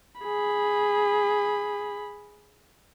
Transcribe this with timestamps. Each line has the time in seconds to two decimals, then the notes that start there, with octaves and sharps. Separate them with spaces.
0.21 G#4 B5